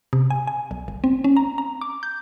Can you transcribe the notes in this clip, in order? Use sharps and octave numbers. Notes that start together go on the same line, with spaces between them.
C3
G#5
G#5
B1
G1
C4
C#4
A#5
A#5
D6
G6